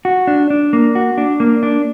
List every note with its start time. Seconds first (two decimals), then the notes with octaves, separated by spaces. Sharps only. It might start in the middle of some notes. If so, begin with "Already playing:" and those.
0.05 F#4
0.27 D4
0.50 D4
0.73 A#3
0.95 F#4
1.18 D4
1.40 A#3
1.63 D4